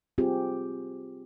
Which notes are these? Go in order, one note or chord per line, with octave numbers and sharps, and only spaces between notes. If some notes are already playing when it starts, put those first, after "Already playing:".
C4 F4 G4 G#4